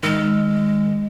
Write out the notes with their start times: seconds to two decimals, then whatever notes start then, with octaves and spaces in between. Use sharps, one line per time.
0.03 D#3 G#3 E6 F6